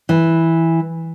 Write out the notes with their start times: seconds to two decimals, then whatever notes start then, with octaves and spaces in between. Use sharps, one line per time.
0.09 E3